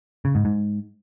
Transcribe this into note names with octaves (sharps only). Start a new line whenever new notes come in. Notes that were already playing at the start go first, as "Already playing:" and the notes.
C#3
G#2
G#2